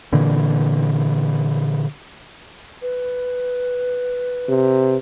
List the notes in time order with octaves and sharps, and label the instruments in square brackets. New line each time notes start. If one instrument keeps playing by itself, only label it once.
[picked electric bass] A#2 D3 E3
[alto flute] B4
[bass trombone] C3